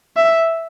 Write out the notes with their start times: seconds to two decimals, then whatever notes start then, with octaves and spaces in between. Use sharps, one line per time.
0.16 E5